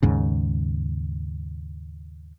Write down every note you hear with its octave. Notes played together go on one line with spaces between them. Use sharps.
D#2 G#2 C#3